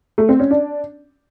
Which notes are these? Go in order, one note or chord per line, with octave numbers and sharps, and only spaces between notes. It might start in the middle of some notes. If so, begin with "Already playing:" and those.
A3
C4
C#4
D4